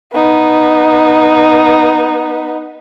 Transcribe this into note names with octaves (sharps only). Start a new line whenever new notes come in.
B3 D#4